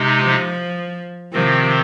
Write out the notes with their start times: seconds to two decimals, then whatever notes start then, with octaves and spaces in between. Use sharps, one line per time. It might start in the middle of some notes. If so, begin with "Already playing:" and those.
Already playing: C3 G#3 D#4
0.21 F3
1.32 C3 D#3 F3 C4